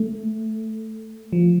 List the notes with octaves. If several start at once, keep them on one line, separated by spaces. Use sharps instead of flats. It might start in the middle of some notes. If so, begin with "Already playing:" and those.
Already playing: A3
F3